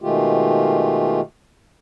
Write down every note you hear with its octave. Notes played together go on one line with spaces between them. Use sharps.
B2 D#3 G#3 A3 F4 G4